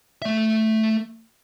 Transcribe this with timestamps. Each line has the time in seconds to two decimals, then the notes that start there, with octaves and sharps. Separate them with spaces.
0.22 A3 E5